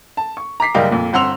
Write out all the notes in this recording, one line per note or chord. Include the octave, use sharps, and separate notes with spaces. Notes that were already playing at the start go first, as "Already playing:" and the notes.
A5
C#6
A#5 D6 B6 C7
F#1 G3 A#4 D#5 F5 G5
F2 A#2
G1 C4 F#5 C6 E6 F7